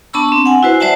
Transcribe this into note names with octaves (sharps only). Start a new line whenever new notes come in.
B3 D4 A5 B5 C#6 E6
C4
F#5 G#5
E4 F#4 B4 C5
G3 C5 D5 E5 F#5 A5